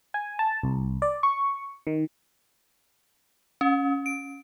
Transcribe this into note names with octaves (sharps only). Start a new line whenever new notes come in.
G#5
A5
C2
D5
C#6
D#3
C#4
D7